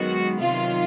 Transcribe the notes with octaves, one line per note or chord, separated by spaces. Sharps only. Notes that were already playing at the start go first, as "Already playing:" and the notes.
Already playing: F#2 D#3 G#3 B3 F#4
C3 D#3 F#3 F4